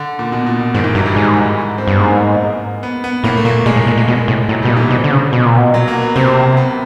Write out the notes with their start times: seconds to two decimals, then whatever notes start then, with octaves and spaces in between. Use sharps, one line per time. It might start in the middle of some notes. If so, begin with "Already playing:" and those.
Already playing: D3
0.19 A#2
0.32 B2
0.46 A#2
0.60 B2
0.74 G#2 D#3
0.84 E3
0.95 G2 F#3
1.06 G3
1.16 G#2 G#3
1.78 C4
1.88 G2 B3
1.99 G#2 A#3
2.83 B3
3.04 B3
3.24 A2 A#3
3.37 A3
3.45 A#2 A#3
3.66 A#2 G#3
3.76 A2
3.87 A#2
3.97 A#2
4.08 B2
4.28 A2
4.49 A2 F#3
4.63 B2 G3
4.70 A#2
4.77 E3
4.90 B2 F3
5.04 D3
5.11 C#3
5.33 B2
5.45 A#2
5.57 B2
5.74 F#3
5.88 A#3
6.02 B3
6.16 C3 C4
6.57 B3